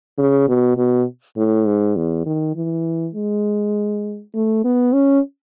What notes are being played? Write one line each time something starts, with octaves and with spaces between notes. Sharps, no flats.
C#3
B2
B2
A2
G#2
E2
D#3
E3
G#3
A3
B3
C#4